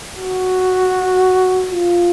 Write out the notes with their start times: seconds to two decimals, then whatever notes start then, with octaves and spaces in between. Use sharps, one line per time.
0.18 F#4
1.69 F4